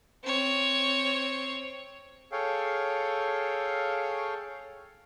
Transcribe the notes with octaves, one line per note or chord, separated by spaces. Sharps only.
C4 C#5
G#4 A4 C#5 F5 G5